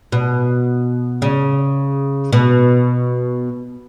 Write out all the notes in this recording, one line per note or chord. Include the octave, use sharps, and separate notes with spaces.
B2
C#3
B2